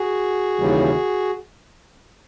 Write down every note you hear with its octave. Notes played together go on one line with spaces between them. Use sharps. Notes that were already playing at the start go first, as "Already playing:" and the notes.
Already playing: F#4 G#4
D#2 C#3 E3 G3